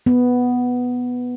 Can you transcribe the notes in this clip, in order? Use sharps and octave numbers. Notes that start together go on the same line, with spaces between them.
B3